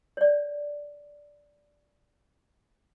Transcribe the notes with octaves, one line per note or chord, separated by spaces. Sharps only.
C#5 D5